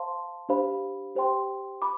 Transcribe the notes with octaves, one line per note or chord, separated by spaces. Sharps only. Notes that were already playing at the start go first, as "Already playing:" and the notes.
Already playing: C5 F5 A5 C6
D4 G4 C5 F5 B5
G4 C5 G5 C6
B5 D6